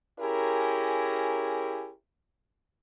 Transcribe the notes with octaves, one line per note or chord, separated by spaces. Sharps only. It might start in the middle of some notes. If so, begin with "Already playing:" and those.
C#4 E4 G4 G#4 A#4